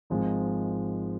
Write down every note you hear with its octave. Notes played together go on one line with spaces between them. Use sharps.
G#1 G#2 F3 G#3